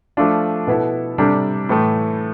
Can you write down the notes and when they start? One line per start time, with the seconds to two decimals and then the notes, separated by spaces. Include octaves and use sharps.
0.17 F3 A3 D4 F4
0.67 B2 B3 E4 A4
1.18 C3 G3 D4 A4
1.69 A2 E3 A3